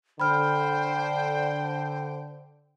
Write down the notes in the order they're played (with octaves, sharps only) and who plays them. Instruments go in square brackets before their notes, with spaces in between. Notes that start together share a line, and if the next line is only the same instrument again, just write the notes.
[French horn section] D3 [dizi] C5 [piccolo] G5 [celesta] B5 F6